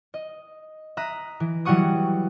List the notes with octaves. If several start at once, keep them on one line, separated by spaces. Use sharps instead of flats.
D#5
E5 A#5 D#6 F#6
E3
E3 F#3 G3 F#5 C#6 D#6